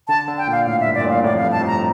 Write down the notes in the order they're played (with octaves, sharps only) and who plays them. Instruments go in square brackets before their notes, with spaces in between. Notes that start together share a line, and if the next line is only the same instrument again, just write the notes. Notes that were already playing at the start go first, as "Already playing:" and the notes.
[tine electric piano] D3 [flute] A5
[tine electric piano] D3
[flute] G5
[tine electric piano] A#2 [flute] F5
[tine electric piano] A2 [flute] F5
[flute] E5
[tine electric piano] G2
[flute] D5
[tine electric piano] A#2
[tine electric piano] A2 [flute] F5
[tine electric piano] A2 [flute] D5
[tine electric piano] F2 [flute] F5
[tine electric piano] G2
[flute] A5
[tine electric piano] F2
[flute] A#5